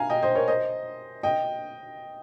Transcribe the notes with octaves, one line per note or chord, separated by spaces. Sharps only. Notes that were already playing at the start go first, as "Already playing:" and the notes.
Already playing: F5 G#5 A#5
D#5 G5
C5 D#5
A#4 C#5
C5 D#5
D#5 G5